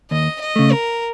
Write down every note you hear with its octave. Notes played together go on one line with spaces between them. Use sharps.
D#2 D#5
D#5
C#3 A3
A#4